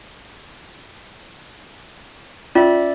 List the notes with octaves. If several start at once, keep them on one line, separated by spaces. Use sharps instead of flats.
C#4 F4 D5 E5